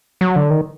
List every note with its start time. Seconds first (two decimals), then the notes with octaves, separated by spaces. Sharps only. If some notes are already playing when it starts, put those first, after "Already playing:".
0.21 F#3
0.36 D3
0.50 D#3